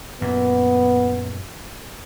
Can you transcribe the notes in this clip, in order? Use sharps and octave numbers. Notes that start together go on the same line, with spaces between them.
F#2 A#2 B3